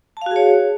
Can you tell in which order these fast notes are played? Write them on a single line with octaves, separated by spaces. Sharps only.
A5 F5 F#4 G#4 C#5